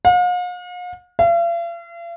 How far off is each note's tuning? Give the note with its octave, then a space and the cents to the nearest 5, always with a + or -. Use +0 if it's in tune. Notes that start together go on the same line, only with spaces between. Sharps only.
F5 +45
F5 -45